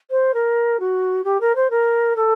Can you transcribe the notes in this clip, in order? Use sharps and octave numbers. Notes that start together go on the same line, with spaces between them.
C5
A#4
F#4
G4
A#4
C5
A#4
A4